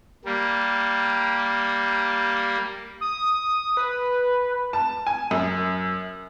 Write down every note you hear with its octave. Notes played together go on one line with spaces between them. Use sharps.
G3 A#3
D#6
B4
A5
G#5
F#2